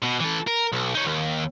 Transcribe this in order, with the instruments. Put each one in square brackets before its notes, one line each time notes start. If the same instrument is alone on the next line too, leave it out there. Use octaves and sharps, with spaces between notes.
[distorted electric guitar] B2
E3 A4
A#4
B1
D#4 C#5
D#2